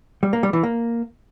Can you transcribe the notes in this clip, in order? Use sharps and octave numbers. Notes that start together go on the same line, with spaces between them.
G3
A#3
G3
E3
A#3